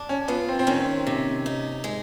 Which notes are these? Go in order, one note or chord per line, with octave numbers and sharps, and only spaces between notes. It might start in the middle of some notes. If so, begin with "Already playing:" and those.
Already playing: D4
C#4
B3 F4
C4
C4
D#3 C#4
C3
D#4
G#3